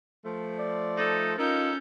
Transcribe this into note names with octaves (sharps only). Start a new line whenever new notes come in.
F3 A3
D5
D#4 A4
C#4 D#4 F4 A4 A#4 G6